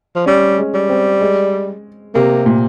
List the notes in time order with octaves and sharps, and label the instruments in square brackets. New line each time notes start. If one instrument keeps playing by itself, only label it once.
[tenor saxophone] F3
[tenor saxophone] G3 [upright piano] C#4
[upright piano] G#3
[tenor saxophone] G3
[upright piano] C4
G#3
[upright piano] C3 [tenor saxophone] A#3
[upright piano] A#2